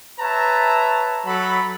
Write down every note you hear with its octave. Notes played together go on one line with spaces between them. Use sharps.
B4 C#5 E5 A5 A#5
F#3 A4 B5